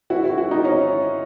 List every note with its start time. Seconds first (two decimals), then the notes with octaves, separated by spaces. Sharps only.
0.10 E4 F#4
0.24 E4 F#4
0.37 E4 F#4
0.51 D#4 F4
0.65 C#4 D#4